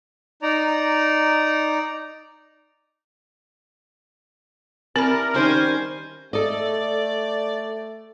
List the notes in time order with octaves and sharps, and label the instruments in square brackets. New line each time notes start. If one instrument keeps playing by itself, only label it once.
[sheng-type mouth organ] D#4 D5 A#5
[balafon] C4 B5 [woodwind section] E4 G4 A#4 [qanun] D5 A5
[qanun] D#3 G3 C#4 [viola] C5 G#5
[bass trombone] A3 [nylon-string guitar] A4 D#5 [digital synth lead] D5